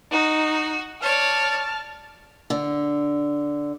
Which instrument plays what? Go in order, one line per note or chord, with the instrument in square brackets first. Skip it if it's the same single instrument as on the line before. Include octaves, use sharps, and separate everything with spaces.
[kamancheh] D#4 [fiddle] F#4
[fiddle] C#5 D5 [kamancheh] A5 F6
[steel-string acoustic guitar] D3